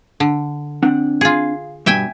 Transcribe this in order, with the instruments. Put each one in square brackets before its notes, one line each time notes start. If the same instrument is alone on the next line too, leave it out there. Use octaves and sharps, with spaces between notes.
[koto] D3
[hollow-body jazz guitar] C4 D4 F#5
[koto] F4 G#4
[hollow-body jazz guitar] G2 B2 [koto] E5 G5 G#5